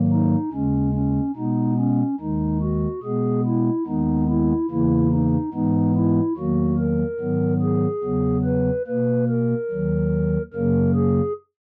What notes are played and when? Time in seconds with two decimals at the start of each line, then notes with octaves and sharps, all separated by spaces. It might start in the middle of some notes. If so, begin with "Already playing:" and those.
Already playing: G#2 D#3 F#3 A#3
0.12 D#4
0.53 D#2 C#3 G#3 C#4
0.94 C#4
1.36 B2 G#3 B3 D#4
1.78 C#4
2.20 D#2 D#3 G#3 D#4
2.62 F#4
3.03 B2 G#3 B3 G#4
3.45 E4
3.86 D#2 D#3 G#3 B3 D#4
4.28 E4
4.70 E2 C#3 E3 A#3 E4
5.12 D#4
5.54 G#2 E3 G#3 B3 D#4
5.95 E4
6.37 E2 D#3 F#3 A#3 F#4
6.78 A#4
7.20 G#2 D#3 F#3 B3
7.62 G#4
8.04 E2 C#3 F#3 B3
8.45 B4
8.87 B2 A#3 B4
9.29 A#4
9.71 D#2 D#3 F#3
10.53 F#2 C#3 F#3 A#3 A#4
10.95 G#4